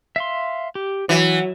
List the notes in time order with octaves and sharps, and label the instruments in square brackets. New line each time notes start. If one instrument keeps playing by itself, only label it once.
[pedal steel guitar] E5 F5 C6
G4
[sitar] E3 [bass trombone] F#3 [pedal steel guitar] F#5